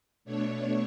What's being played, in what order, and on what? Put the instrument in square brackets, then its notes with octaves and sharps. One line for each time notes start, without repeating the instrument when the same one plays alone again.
[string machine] B2 A3 D4 C#5